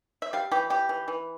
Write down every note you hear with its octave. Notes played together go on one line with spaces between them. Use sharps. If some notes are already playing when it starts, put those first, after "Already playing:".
E5
G3 F5
E3 G4
E3 G4
E3
E3